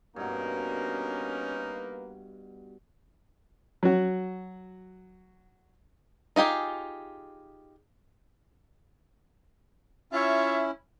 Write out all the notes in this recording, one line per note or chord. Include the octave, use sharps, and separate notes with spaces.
G2 B2 A#3 C#4 D#4 A#4 B4
F#3 F#4
D#4 F4 G4 G#4
C#4 E4 F4 C#5 E5